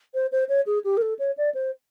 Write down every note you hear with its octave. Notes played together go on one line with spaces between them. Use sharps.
C5
C5
C#5
G#4
G4
A#4
A4
C#5
D5
C5